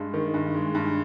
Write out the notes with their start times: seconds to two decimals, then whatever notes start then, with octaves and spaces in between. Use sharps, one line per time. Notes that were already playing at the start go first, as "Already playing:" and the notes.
Already playing: G2 G#3
0.14 D#3
0.34 G2
0.54 G#3
0.75 G2